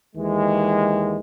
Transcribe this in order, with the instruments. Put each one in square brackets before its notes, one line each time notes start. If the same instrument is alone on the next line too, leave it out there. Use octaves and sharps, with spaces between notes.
[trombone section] D#2 E3 G#3